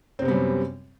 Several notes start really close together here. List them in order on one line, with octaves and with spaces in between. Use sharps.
C4 C3 B3 G3 F#2